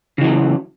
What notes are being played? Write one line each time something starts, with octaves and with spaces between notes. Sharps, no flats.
C#3 E3 F#3